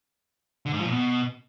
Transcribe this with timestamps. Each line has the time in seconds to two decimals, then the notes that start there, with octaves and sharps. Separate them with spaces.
0.66 D3
0.72 G#2
0.79 F3
0.86 A#2
0.92 B2